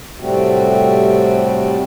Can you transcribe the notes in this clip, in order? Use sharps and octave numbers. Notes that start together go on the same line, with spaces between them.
A2 C3 G3 A3 C4 F#4